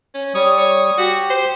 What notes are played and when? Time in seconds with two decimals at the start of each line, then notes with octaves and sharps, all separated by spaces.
0.14 C#4
0.35 G3 C#5 D#6
0.58 C#5
0.98 F#4 G4
1.30 C5